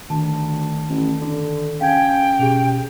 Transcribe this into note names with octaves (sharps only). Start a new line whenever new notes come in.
D2 D#3 A5
A1
D3
C#3 F5 G5 G#5 G#6
B2 C#4 G4 G#4 F7